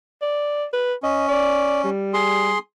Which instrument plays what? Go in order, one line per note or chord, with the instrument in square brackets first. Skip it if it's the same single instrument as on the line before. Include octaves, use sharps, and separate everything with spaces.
[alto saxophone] D5
B4
[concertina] C#4 [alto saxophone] D#5
[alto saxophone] D5
G3
[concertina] G#4 C6